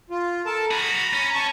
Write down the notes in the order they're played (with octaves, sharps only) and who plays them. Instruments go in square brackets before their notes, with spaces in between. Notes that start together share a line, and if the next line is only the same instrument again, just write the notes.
[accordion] F4
A4 A#4 A5
[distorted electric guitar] F#4 G#4 [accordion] A#5 B5
[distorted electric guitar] C#4
[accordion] A5 C#6